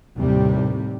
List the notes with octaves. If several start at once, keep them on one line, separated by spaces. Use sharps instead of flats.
D#2 A2 C3 G3